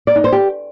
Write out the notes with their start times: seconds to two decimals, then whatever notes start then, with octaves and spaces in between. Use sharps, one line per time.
0.07 D5
0.16 D#4
0.24 C5
0.32 G4